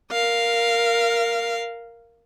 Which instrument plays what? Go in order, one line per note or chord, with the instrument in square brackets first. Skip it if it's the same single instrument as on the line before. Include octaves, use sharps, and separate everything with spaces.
[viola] A#4 F5